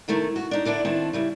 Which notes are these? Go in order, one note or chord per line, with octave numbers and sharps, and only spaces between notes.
C3 D#3 A3 E4
F#4
D4 D#4
D3 D4 E4 D5
D#3 B3 C4 D4 E4 A5
C#3 G3 E4